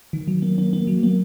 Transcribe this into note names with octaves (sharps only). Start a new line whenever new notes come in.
D#3
F#3
A#3
A#3
A#3
F#3
A#3